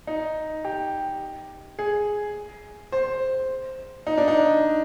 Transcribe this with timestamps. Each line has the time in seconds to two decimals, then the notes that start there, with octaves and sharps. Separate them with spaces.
0.07 D#4
0.65 G4
1.79 G#4
2.92 C5
4.07 D#4
4.17 D4
4.28 D#4